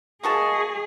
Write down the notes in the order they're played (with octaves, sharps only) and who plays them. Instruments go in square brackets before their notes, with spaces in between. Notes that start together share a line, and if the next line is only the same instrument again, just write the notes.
[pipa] A#3 F#4 A5 [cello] G#4 [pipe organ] D#5 C#6